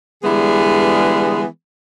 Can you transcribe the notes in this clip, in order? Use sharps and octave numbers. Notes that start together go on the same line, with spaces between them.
D3 E3 G3 G#3 B3 G#4